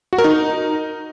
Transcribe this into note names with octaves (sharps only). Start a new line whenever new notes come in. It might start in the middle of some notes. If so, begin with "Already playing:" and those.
F#4
A#4
D#4